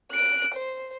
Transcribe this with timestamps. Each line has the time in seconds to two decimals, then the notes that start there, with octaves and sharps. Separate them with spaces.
0.11 F#6 D7
0.54 C5